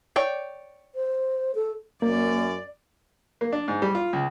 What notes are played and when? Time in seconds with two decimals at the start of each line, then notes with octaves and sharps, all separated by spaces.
0.16 C#5 D5 G5
0.95 C5
1.55 A4
2.02 F#2 A#3 D5
3.41 A#3
3.52 D4
3.68 G#2
3.82 G3
3.95 F4
4.13 C#2